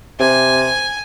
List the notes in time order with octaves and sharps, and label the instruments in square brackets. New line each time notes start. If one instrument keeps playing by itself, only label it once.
[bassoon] C3 [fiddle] G#5